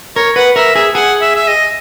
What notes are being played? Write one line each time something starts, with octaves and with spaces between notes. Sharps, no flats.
A#4 C#5
B4 F#5
A#4 E5
G#4 E5
G#4 F#5
E5
E5
D#5